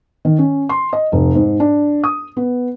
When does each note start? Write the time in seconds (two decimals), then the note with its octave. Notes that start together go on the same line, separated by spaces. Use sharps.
0.25 D#3
0.39 C#4
0.69 C6
0.93 D#5
1.12 F1
1.35 G#2
1.60 D4
2.04 D#6
2.37 B3